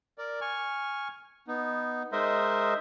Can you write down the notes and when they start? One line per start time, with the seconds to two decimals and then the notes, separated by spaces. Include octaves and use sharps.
0.18 A#4 D5
0.41 G#5 C#6 F6
1.48 B3 D#4
2.12 G#3 D#4 A#4 C5 D#5 E5